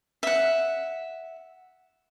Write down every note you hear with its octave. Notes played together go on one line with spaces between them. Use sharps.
E5 F#5